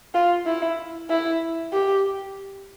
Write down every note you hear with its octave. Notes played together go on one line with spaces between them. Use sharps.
F4
E4
E4
G4